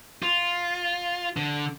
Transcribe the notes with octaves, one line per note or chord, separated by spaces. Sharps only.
F4
D3